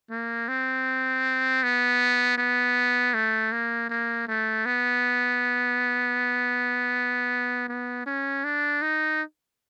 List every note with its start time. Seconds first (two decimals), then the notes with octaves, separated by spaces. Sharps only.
0.11 A#3
0.48 C4
1.63 B3
2.38 B3
3.15 A3
3.52 A#3
3.90 A#3
4.28 A3
4.66 B3
7.68 B3
8.06 C#4
8.44 D4
8.82 D#4